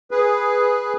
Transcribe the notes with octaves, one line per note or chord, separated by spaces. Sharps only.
G#4 B4